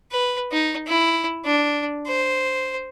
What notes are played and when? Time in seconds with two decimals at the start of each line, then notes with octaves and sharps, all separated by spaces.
0.11 B4
0.52 D#4
0.87 E4
1.45 D4
2.07 C5